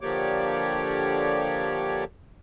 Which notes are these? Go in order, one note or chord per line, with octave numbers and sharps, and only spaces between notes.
D3 F3 A#3 G4 C#5 D5